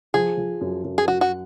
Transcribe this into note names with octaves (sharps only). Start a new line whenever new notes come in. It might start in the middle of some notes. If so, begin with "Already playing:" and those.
F3 G#4
F3
F#2
F#2
G#4
F#3 F#4
F#4